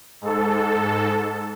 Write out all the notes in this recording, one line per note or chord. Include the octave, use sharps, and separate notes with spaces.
G#2 A4